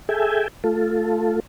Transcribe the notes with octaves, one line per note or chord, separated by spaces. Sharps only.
G#4 A4 E5 G5 G#5
A3 F4 A4